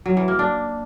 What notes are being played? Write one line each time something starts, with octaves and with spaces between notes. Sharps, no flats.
F#3
E3
A#3
D4